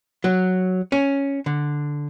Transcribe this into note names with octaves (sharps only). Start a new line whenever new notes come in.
F#3
C#4
D3